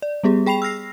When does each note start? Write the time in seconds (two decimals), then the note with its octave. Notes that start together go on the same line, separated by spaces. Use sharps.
0.02 D5
0.24 G3 B3 G4 G#4
0.46 G#4 G5 B5 C7 F7
0.62 E6 F6 A#6 C7